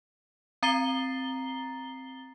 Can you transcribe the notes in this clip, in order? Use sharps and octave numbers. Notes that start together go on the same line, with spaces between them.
C4 A#5 A6 C7 G7